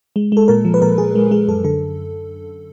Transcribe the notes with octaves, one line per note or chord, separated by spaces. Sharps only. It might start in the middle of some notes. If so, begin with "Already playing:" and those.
G#3
G#3 A4
A#2 A#4
F3
B4
A#2 A#4
A#2 G#4
G#3
G#3 G#4
F#2 A4
D3 A4